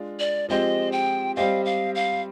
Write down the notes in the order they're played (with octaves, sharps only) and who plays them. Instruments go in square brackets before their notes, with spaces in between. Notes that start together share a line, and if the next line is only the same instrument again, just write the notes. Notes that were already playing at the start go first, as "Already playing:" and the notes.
Already playing: [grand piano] G#3 D4 F4
[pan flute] D5
[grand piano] F3 G#3 C4 G4 C5 [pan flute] D#5
[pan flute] G5
[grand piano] G3 C4 G4 C5 D#5 [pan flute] F5
[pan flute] F5
F5